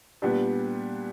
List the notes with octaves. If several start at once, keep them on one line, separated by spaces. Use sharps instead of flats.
A#2 G3 B3 D4 G4